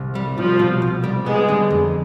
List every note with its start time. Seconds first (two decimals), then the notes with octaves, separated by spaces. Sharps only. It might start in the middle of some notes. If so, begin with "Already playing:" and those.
Already playing: C2
0.15 G3
0.37 C2 F3
0.59 B2
0.82 C2
1.04 G3
1.26 G#3 B3
1.49 D3
1.70 F2